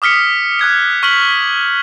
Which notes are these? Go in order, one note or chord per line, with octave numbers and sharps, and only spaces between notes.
D6 D#6 F6 B6 C#7
D#6 F#6 G#6 C#7
C#6 F6 B6 F#7